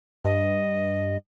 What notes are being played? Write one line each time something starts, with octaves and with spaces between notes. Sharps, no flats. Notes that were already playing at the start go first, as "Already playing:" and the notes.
G2 D#5